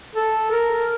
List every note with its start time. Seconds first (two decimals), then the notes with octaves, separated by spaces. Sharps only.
0.15 A4
0.51 A#4